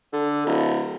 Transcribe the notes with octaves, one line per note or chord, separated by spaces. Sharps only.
D3
D1